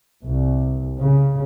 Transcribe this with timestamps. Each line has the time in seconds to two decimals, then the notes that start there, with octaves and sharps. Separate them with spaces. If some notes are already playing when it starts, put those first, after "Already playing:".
0.24 C2
1.00 C#3